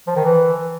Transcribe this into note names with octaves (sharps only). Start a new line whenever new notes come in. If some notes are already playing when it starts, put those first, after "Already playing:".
F3
D#3
E3